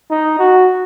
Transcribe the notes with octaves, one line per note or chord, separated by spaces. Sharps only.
D#4
F#4